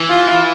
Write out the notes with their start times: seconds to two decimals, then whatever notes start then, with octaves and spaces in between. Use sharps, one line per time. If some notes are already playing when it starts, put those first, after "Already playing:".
Already playing: E3
0.10 F4